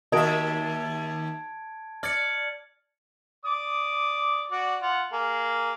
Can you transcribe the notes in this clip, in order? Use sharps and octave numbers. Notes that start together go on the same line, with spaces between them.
D#2 F#4 A#4 D#5 E5 A5 G#6 D7
D5 F6 G#6 C#7
D5 D6 D#6
F#4 D5
F4 F#5
A#3 G#4